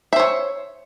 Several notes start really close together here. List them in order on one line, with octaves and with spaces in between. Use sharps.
E5 C5 C#5